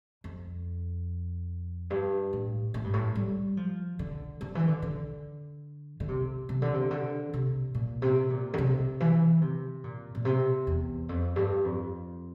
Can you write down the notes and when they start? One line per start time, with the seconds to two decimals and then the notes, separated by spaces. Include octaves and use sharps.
0.24 F2
1.90 G2
2.33 A2
2.74 A2
2.84 G2
2.93 A2
3.15 G3
3.57 F3
3.99 D3
4.41 D3
4.55 E3
4.68 D3
4.82 D3
6.00 D3
6.08 C3
6.49 C3
6.62 D3
6.74 C3
6.91 D3
7.33 C3
7.74 A#2
8.02 C3
8.30 A#2
8.53 D3
8.58 C3
9.00 E3
9.41 C3
9.84 A#2
10.15 A#2
10.25 C3
10.67 E2
11.09 F2
11.36 G2
11.65 F2